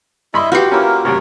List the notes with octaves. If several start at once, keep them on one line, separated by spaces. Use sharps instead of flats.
G2 E4 D#5 E5 B5 C6
F#4 G4 B4 F5 G5 C6
A#3 C#4 E4 F4 A#4
F#2 A2 C3 A#4 C#5